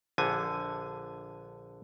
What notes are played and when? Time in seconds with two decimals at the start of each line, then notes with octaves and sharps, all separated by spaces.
0.18 A#1 D3 G#5